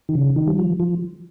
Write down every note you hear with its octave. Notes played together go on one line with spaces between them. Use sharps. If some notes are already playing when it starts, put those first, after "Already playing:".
D#3
C#3
D#3
G3
F3
F3